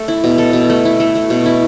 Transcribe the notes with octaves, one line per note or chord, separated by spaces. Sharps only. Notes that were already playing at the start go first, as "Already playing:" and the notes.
Already playing: A3 A4
E4
B2
A4
B2
A3
E4
A3
A3
B2
E4